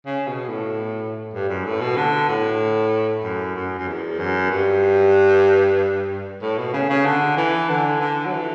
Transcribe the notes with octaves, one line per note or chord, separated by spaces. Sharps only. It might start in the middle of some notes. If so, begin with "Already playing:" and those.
C#3
B2
A2
G2
F#2
A2
B2
D3
A2
F#2
F#2
F#2
E2
F#2
G2
A2
B2
C#3
C#3
D3
E3
D3
D3
F#3
E3